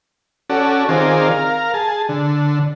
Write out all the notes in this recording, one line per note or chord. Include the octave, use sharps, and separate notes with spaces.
C#4 F#4 A4 D5
D#3 C4 F4 G#4 A#4 D5
A#4 F5
G#4 A5
D3